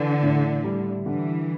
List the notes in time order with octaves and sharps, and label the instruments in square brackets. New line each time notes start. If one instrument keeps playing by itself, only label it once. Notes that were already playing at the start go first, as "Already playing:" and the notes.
Already playing: [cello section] D3 [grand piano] E3
[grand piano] A2
G3
[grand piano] D3 [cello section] E3